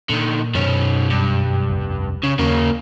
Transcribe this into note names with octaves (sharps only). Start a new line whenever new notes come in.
A#2 D3 D#3
F#2 B2 D#3 C#4
G2
F1 C2
C#3
D#2 C#3 A#3